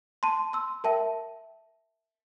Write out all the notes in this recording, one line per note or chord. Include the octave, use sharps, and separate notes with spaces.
A5 C6
C6 E6
A#4 E5 G5 A5